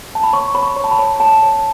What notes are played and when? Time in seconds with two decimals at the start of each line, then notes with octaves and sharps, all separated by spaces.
0.15 A5
0.24 B5
0.33 C#5 C#6
0.55 C#5 B5
0.63 C#6
0.76 C#5
0.84 A5
0.91 B5
0.99 C#5
1.20 C#5 A5
1.43 C#5